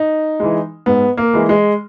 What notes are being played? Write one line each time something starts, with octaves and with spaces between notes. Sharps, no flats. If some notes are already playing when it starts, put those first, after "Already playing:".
Already playing: D#4
E3 G#3
G#2 B3
A#3
E3 G#3
G#3